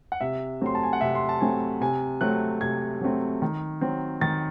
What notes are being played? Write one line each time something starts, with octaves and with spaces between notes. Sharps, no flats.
F#5
C3 E5
F#3 A3 C4 C6
A5
G#5
F#5
C3 E5
C6
A5
F#3 A3 C4 G#5
C3 G#5
F#3 A3 C4 F#6
C3 G#6
F#3 A3 C4
D#3
F#3 C4
D#3 A6